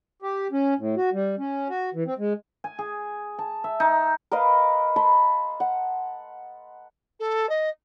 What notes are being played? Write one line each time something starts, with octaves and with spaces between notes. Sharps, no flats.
G4
C#4
A2
F#4
G3
C#4
F#4
E3
C4
G#3
G#5
G#4
A5
E5
D#4
A#4 B4 D#5 F5
A5 B5 C6
F#5
A4
D#5